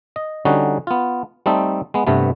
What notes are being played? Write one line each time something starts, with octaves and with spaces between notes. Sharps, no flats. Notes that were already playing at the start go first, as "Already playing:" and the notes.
D#5
D3 G3 C#4 D#4 F#4
B3 F4
G3 A3 C4 D#4 A4
G#3 B3
G2 C3 A3 B3